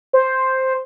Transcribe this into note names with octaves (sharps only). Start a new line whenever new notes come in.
C5